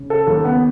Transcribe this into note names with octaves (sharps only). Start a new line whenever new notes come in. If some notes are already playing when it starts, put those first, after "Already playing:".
Already playing: C#3
A4
D#2 A4
B3